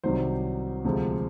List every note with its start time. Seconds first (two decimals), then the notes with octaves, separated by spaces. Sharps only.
0.04 C2 C3 D#3 F#3 C5
0.84 D2 C3 F3 G#3